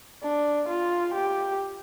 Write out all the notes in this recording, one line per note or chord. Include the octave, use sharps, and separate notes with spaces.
D4
F4
G4